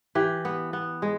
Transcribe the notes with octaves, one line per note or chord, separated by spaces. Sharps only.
E3 G4
B3
B3
G#3